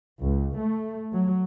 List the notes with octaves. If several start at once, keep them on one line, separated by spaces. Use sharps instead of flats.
C#2
A3
F#3